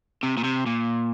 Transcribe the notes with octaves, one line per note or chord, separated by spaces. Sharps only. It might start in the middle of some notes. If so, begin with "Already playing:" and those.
C3
A#2
C3
A#2